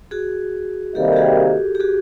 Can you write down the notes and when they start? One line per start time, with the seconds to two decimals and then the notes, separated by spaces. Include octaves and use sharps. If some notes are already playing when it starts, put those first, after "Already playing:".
0.11 F#4 G#4
0.95 C3 D#3 G3 A#3 D#4 G4 A4
1.13 G4
1.16 F#4 G#4
1.75 G4
1.80 F#4 G#4